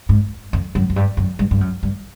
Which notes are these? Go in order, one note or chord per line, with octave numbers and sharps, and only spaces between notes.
G#2
F2
F#2
F#2
G2
F#2
G2
G2
F#2
G2